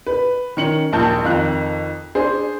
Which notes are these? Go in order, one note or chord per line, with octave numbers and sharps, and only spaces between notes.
B4
D#3 C#4 C#7 F#7
A#1 D#2 A5 G6
F2 D#3 F5 F#6
D4 G#4 C5